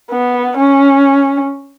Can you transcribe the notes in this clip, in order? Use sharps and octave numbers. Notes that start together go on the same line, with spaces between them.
B3
C#4